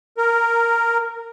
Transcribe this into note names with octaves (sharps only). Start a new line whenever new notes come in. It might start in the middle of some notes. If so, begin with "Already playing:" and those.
A#4